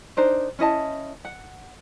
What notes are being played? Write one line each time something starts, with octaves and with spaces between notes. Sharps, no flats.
D4 D#4 A#4 C5
C#4 E4 D#5 A5
F#5